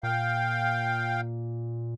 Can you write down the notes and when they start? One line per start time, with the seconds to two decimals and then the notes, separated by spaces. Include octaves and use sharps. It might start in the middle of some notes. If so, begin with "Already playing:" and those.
0.03 A#2 F5 G5